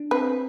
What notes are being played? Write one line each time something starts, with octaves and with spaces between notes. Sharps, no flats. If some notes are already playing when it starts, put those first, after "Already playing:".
Already playing: D4
C4 B4